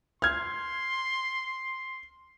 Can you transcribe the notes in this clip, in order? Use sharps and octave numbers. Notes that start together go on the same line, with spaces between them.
C6 F6 G#6